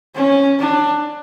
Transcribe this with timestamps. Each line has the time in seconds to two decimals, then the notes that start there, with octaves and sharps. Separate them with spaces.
0.15 C#4
0.59 D4